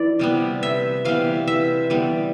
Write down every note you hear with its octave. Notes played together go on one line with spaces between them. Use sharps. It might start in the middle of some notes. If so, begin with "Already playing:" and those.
Already playing: E3 E4 D5
C3 G3 B3
E5
C3 E3 G3 B3 F5
E5
E3 G3 B3